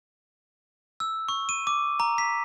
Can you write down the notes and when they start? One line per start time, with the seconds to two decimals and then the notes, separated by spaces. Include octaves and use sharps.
1.00 E6
1.28 C#6
1.49 D#7
1.67 D6
2.00 A#5
2.18 B6